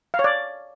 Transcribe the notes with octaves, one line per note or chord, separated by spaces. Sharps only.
F5
C#5
D5